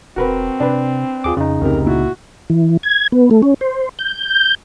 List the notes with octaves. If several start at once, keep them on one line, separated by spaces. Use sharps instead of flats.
E1 C4 F#4 A#4 B4
C3 D4 B4
D#2 F4 G#4 D6
F2 C#3 D#4
F1 C#2 C3 A#4
A#2 E4 F#4
E3
G#6
B3
A3
C#4
C5
G6